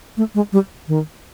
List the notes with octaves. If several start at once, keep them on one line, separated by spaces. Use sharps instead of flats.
A3
G#3
G3
D#3